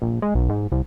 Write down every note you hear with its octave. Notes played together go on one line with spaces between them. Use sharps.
A#1
G#3
B1
G#2
C2